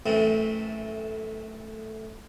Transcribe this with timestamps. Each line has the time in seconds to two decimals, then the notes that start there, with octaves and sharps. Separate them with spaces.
0.06 F#2 A2 E3 A3 C4